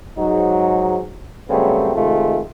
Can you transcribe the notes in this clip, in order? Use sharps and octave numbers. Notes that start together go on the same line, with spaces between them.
G#2 F#3 D#4
C#3 F#3 G3 A3 B3 C4
C3 D#3 G#3 A3 F4